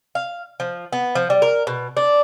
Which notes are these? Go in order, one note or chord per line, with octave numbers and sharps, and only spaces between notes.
F5
F3
B3
F3
G3
A#4
B2
D4